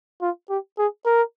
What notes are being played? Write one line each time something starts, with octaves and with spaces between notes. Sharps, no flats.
F4
G4
G#4
A#4